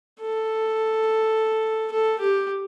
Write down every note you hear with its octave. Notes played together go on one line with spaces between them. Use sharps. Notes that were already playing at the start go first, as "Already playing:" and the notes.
A4
A4
G4